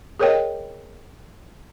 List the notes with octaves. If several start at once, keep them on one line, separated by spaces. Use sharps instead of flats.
G#4 A#4 C#5 D#5 G5